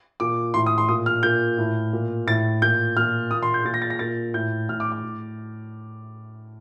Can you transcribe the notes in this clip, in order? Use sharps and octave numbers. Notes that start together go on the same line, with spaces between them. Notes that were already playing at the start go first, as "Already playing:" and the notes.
A#2 D6
A2 C6
D#6
C6
A#2 D#6
F6
A#2 G6
A2
A#2
A2 A6
A#2 G6
A#2 F6
A#2 D#6
C6
G6
A#2 A6
A#6
A6
A#6
A#2 A6
A2 G6
A2 F6
D6
D6
A2